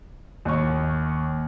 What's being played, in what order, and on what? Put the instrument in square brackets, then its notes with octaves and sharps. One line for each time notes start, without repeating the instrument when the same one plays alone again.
[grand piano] D#2 C#6